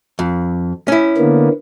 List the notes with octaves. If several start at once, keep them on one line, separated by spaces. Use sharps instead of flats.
F2
C#4 E4
D3 A#3 B3